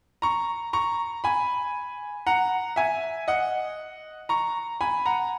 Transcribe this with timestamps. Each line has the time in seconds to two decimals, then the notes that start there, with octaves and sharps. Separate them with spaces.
0.22 A#5 C#6
0.73 A#5 C#6
1.24 G#5 B5
2.27 F#5 A#5
2.76 E5 G#5
3.28 D#5 F#5
4.29 A#5 C#6
4.81 G#5 B5
5.06 F#5 A#5